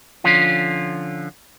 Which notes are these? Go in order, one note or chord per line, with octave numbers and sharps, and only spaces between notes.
D3 F3 C#4 F4